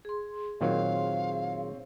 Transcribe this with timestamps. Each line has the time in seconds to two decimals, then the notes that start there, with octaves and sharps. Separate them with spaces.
0.05 G#4 C6
0.61 A#2 D#3 F#3 C4 C5 C#5 F5